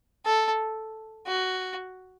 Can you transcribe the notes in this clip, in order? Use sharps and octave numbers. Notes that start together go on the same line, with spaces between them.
A4
F#4